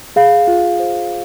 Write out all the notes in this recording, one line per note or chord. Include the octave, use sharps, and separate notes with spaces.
G#4 F5
F4
C5